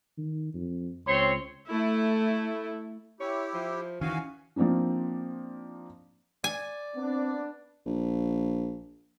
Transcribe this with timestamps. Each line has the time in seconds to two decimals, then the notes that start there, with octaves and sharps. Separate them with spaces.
0.18 D#3
0.54 F2
1.07 C#2 C4 C#5 C6
1.70 A3 E4
3.20 E4 G4 C#5
3.54 F3
4.01 D#3 E3 C#4 F#4 F5 G#5
4.56 F3 A#3 C4 D4 D#4
6.44 D5 G#5
6.96 B3 C4 D4
7.86 A#1